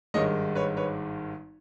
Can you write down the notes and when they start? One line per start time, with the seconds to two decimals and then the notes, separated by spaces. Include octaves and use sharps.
0.14 G#1 G2 D#3 G#3 C#5 D#5
0.55 B4 C#5
0.77 B4 C#5